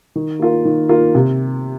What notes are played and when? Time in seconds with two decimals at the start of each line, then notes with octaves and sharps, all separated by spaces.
0.16 D#3
0.39 A#3 F4 A#4
0.65 D#3
0.89 A#3 F4 A#4
1.15 C3